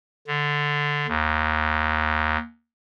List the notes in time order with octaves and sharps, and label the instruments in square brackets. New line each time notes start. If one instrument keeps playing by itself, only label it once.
[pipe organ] D3
D#2